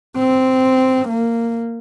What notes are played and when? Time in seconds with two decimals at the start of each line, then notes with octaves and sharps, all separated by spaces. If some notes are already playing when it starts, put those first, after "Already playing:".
0.17 C4
1.08 A#3